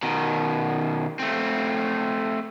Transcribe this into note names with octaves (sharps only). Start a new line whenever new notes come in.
B2 D#3
A3 C4